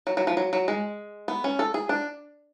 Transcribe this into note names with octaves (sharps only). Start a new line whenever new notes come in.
F#3
F#3
F3
F#3
F#3
G#3
B3
C#4
A4
G#4
D4